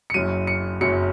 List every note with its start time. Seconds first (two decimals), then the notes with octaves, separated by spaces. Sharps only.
0.10 C#7
0.14 F#1 F#2 F#3 D#7
0.47 C#7
0.81 F#1 F#2 F#3 C#7